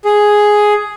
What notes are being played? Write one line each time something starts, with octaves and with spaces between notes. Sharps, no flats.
G#4